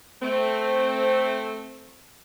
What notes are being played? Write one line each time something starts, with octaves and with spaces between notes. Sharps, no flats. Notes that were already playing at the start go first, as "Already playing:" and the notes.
A3 C4